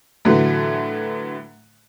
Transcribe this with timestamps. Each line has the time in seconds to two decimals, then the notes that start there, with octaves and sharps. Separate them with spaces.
0.25 A2 D3 E3 F#3 A3